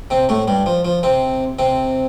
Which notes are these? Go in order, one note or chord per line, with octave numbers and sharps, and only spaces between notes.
C3 C4
A2 A3
G2 G3
F3
F3
C3 C4
C3 C4